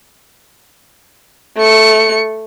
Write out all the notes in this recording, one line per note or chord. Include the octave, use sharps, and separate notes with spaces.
A3 C#7